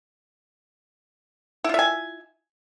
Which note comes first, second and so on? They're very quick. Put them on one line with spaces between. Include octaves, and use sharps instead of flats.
E4 F4 E5 G#5